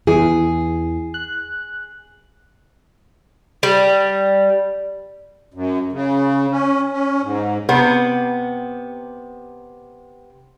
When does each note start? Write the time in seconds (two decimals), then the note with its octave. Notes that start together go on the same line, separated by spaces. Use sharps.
0.07 E2 E3 G#4
1.14 F#6
3.63 G3
5.54 F#2
5.92 C#3
6.51 C#4
6.92 C#4
7.22 G#2
7.69 C3 B3